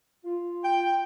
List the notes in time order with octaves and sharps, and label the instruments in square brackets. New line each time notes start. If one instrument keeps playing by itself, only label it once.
[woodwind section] F4
[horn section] G5